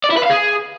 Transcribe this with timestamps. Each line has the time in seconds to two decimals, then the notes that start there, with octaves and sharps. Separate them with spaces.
0.04 D5
0.10 E4
0.17 B4
0.24 F5
0.30 G#4